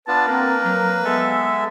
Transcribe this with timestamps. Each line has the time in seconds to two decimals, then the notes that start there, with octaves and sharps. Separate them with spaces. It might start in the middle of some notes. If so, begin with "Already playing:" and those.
0.08 B3 D4 F4 B4 A5
0.27 A#3 C4 A#4
0.64 F#3
1.05 G#3 B3 A4 E5